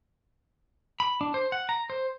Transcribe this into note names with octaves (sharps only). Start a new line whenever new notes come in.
B5
D4
C5
F#5
A#5
C5